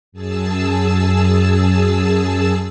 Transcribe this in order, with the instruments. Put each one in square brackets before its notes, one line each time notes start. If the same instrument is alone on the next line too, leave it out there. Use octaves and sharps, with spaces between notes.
[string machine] F#2 G#4 A5 E6